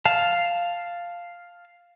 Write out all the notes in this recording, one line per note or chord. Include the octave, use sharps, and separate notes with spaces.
F5 A5